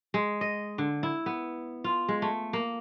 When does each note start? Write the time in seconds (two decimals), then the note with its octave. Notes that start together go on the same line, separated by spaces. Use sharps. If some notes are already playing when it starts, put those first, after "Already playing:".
0.14 G#3
0.41 D#5
0.78 D3
1.03 E4
1.26 B3
1.84 F4
2.08 G#3
2.22 A3
2.53 A#3